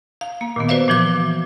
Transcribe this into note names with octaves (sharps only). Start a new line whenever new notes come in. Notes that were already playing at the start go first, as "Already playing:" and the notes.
F5
A#3
A#2 D#3 B3
F#4 B4 C5 D5 E5 F5
A#2 E3 F3 F#4 D6